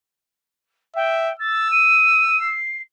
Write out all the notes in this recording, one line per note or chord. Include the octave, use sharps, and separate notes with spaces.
E5 G5
E6 A6
D#7
C7